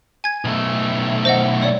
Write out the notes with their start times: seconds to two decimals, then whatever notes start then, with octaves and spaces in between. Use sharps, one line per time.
0.24 G#5 G#6
0.45 B1 A3
1.25 C5 D#5 F#5
1.62 C#5 D5